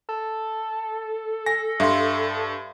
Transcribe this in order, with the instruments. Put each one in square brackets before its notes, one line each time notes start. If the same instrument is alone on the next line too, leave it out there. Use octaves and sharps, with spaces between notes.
[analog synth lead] A4
[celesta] G#5 [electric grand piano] A#6
[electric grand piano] G2 [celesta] E5 F5 C6